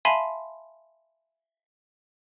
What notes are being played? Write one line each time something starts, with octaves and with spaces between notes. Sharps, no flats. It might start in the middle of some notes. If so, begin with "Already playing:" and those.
E5 F5 G#5 A5 B5 C6